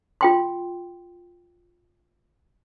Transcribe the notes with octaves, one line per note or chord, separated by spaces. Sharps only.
F4 G5 C6